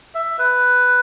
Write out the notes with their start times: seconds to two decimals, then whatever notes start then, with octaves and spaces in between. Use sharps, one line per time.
0.15 E5
0.39 B4